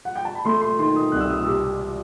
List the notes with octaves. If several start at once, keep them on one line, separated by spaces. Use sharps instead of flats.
F#5
G5
A5
B5
A3 C6
C6
D#3 C6
D#6
C2 F#6
E6
D#6
E6
C3